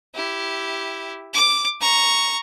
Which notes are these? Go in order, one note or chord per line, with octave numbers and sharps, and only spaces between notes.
E4 G4
D6
A#5 C#6